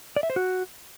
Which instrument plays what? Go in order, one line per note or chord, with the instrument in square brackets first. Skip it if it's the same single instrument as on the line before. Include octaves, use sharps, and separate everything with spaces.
[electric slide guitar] D5
E5
C5
F#4